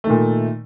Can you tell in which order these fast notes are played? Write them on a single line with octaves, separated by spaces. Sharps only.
A3 D#3 A#2